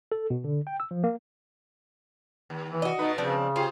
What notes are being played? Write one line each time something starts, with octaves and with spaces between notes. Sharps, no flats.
A4
B2
D3
G5
E6
F3
A#3
D#2
E3
F#4 D#5
B2 A3 D#4 B4
C#3 F3 C4 D4
F4 G4 G#4 C5